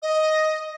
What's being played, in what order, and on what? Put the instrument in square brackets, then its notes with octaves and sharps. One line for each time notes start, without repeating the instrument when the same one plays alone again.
[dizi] D#5